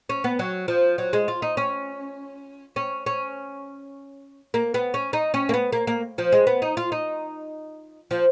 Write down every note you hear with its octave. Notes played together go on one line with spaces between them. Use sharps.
C#4
B3
F#3
F3
F#3
G#3
F4
D#4
C#4
C#4
C#4
A#3
B3
C#4
D#4
C#4
A#3
B3
A#3
A#3
F3
G#3
B3
D#4
F4
D#4
F3